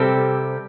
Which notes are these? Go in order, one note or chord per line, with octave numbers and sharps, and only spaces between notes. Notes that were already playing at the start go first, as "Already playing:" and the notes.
Already playing: C3 G3 C4 A4